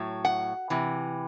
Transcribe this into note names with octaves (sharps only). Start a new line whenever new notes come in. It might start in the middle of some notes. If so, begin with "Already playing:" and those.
Already playing: A2 F#3
F#5
C3 E3